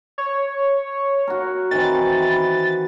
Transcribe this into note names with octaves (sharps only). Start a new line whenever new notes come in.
C#5
F#4 A#4
D#3 E3 C4 A6
B4